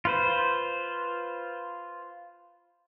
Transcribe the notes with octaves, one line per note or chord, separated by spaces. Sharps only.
F4 B4 C5